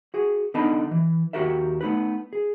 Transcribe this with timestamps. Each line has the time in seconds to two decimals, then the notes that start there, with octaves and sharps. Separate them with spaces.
0.14 F#4 G#4
0.54 D3 B3 D4 D#4 A5 B5
0.91 E3
1.33 D#2 F#4 G4 A#4 E5
1.81 A3 B3 D#4 B4
2.33 G#4